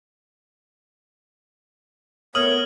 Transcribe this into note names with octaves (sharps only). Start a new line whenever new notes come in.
A3 B3 A#4 C#5 D#6 F6 F#7